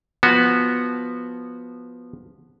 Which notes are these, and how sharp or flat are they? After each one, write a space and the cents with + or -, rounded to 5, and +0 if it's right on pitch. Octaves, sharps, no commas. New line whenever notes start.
F3 +0 B3 -10 F#4 +0